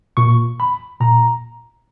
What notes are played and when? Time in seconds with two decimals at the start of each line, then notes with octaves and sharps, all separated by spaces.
0.17 A#2 C#6
0.60 B5
1.01 A#2 A#5